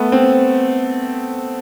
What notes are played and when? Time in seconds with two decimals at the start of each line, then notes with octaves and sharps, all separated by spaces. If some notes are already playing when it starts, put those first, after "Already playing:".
Already playing: A3 B3
0.12 C4